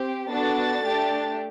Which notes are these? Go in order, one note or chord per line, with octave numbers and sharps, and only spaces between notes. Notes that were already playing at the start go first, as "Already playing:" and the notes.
Already playing: C4 G4
B3 D4 F#4 A4 A6
A3 D4 G4